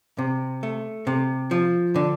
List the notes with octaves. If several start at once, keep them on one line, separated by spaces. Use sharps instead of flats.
C3
A3
C3
F3
D3